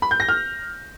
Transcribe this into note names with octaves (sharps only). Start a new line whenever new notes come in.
B5
G6
A#6
F6